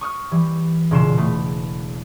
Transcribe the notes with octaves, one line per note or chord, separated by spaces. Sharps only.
C#6 D#6 F6
E3 G3
E1 A#2 C#3 C6 C7 E7
A3 B3